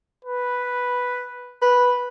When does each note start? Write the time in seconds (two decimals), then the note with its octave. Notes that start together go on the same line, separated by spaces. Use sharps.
0.25 B4
1.62 B4